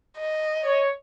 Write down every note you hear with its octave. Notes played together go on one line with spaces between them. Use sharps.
D#5
C#5